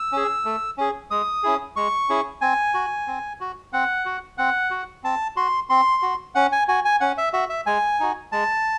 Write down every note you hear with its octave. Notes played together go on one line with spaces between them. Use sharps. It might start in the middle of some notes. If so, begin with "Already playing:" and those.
Already playing: E6
C#4 G#4
A3
C#4 G#4
G#3 D#6
C#4 E4 G#4
G#3 C#6
C#4 E4 G#4
C4 G#5
F#4
C4
F#4
C4 F#5
F#4
C4 F#5
F#4
C4 A5
F#4 C6
C4 C6
F#4
C#4 F#5
G#5
F#4 G#5
G#5
C#4 F#5
E5
F#4 E5
E5
G#3 G#5
D#4 F#4
G#3 A5